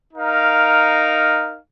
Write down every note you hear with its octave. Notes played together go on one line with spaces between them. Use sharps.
D#4 A#4 F5